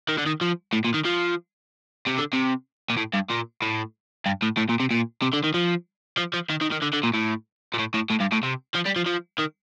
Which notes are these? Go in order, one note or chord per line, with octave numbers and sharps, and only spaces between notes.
D#3
D3
D#3
F3
A2
A#2
D#3
F3
C3
D3
C3
A#2
A2
G2
A#2
A2
G2
A2
A2
A#2
C3
A#2
C3
D3
D#3
F3
F3
F3
D#3
D#3
D#3
D3
D3
A#2
A2
A#2
A2
A2
A2
G2
A2
C3
F3
G3
F3
F3
D#3